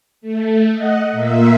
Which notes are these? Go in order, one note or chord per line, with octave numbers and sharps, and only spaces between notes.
A3
D#5 F#5
A#2 A#3 E5